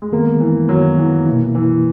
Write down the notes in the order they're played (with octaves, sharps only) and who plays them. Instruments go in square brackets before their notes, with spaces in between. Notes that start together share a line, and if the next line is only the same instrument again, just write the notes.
[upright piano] G#3
[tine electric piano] D#3 G#3 B3 [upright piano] A#3
[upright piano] E3
[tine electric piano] D#3 G#3 B3 [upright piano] F#3
[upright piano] E3
[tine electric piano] B2 A#3 E4
[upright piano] E3